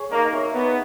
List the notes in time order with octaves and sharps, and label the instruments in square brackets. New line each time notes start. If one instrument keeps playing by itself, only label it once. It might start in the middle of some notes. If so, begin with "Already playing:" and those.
Already playing: [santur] G#4 C#5
[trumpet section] A#3 [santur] D#4
[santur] G#4 C#5 E5
[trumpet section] B3 [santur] D#4